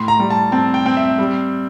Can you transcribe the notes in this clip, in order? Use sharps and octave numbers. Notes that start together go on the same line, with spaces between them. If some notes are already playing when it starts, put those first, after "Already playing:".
Already playing: A2 C6
A#5
G3
A5
C4 A5
G5
C4
E5
G3